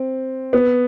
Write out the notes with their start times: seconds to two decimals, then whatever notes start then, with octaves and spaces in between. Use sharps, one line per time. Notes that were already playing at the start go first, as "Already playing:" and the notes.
Already playing: C4
0.53 B3